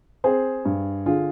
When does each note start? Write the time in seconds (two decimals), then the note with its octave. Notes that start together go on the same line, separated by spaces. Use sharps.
0.24 C4 G#4 C5
0.65 G2
1.06 D3 F4 G#4